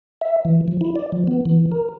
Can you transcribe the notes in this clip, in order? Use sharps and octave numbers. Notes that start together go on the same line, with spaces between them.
E5
E3
F3
E4
D5
F3
B3
E3
A#4